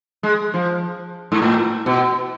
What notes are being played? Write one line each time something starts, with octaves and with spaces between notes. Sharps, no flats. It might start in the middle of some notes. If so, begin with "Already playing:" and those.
G#3
F3
G#2
A2
B2